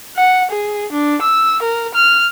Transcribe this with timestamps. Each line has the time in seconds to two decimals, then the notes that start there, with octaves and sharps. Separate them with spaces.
0.17 F#5
0.51 G#4
0.92 D4
1.22 E6
1.62 A#4
1.95 F6